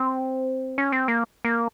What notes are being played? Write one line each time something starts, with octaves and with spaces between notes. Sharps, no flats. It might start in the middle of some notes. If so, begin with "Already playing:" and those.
Already playing: C4
C#4
C4
A#3
A#3